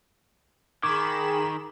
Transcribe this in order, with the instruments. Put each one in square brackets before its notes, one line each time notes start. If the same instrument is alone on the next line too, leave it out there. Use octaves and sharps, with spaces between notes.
[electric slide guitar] D#3 [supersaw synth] G#4 B5 E7 [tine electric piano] C#6 D6 G#6